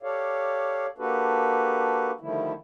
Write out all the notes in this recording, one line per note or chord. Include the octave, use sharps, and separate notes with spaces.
G4 A4 C#5 D5 F5
A#3 D4 F#4 G4 A4 B4
D3 D#3 F3 G3 A3 E4